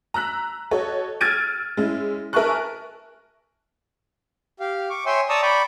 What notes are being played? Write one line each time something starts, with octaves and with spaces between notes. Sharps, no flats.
A#5 E6 F#6 B6
F#4 A4 C#5 D#5
E6 F6 G#6 A6 D7 D#7
G#3 C#4 E4
A#4 E5 G#5 A5 C#6 F#6
G4 F5
C#6 D6
C#5 E5 G5 G#5 C6
D5 A5 A#5 C#6 D#6 E6
D5 G5 B5 C#6 D6